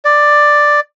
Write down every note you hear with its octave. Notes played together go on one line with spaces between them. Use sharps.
D5